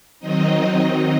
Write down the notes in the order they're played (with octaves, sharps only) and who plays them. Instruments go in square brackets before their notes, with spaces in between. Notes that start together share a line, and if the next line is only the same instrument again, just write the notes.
[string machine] D#3 F#3 C4 D#4 D#5